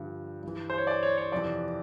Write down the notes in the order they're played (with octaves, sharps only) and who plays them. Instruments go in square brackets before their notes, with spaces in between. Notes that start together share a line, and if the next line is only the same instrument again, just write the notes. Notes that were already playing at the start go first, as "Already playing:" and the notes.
Already playing: [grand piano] G2 D3 F3
G2 E3
C5
C#5
D5
C#5
C#5
F2 C3 E3 D5